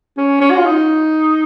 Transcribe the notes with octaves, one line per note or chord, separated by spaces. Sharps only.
C#4
C#4
F#4
F4
D#4